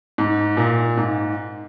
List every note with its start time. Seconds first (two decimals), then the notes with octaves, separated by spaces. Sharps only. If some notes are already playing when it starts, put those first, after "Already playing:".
0.18 G#2
0.57 A#2
0.97 G#2